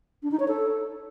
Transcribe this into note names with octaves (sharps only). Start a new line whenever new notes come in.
D4
D#4
C#5
A4